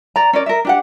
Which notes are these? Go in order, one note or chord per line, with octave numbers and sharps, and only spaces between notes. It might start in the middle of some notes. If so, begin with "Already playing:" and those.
D5 A#5
C#4 A#4 D5
A#4 E5
D4 G4 F#5